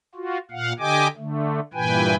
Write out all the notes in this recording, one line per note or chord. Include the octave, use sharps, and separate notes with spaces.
F4 F#4
A#2 F5 F#5
D3 G4 D#5 G5 G#5 D6
D3 A3
G2 A#2 E3 B4 G5 G#5